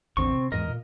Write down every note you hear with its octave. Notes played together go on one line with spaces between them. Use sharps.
A1 E2 D3 C4 C#6
C3
E2 G#2 E3 A#4 D#5
A#2